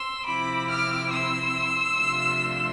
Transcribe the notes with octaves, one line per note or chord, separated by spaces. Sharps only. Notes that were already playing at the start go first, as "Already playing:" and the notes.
Already playing: C6 E6
C3 F3 C4 E4 B5 D6
D6 F6
C6 E6
C3 F3 A3 D4 F4